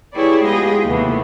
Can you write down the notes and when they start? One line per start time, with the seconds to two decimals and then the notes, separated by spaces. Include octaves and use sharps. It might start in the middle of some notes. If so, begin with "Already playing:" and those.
0.15 E4 G4 G#4 B4 C#5 D5
0.44 G#3 B3 F4 G4 G#4 D#5
0.85 D#2 C3 E3 A3 B3